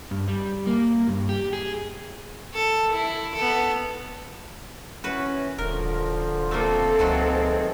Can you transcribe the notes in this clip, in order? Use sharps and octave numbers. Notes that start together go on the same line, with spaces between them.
G2
G3
A#3
G2
G4
G#4
A4
E4
B3 A4
E3 C#4 F#4 B4
D#1 D3 F3 A#4
A3 A#3 C4 A4
C#2 D#3 E3 F#3 F#4 G#4